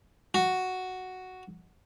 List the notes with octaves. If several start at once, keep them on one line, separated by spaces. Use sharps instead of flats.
F#4